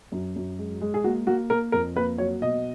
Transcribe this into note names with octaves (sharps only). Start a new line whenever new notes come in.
F#2
F#2
G#3
G#3
G#4
A#3 F#4
A#3 F#4
A#3 A#4
F2 A#4
A#3 B4
F#3 C#5
B2 D#5